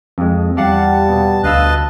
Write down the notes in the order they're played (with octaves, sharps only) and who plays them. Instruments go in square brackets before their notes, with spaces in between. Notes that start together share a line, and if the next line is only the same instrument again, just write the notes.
[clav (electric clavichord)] F2 G#3
[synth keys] E2 F5 F#5 [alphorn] G3 [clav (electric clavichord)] G4 [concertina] A5
[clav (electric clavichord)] B2
[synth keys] D2 F5 E6 [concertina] B4 D#5 A5